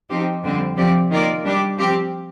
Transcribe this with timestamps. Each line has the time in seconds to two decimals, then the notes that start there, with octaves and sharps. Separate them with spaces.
0.10 F3 C4 D#4 G4
0.43 F2 D3 G3 C4
0.76 C3 F3 C4 G4 D5
1.11 D#3 A#3 F4 A#4 D5
1.44 G3 D4 G4 D5
1.78 F3 C4 G4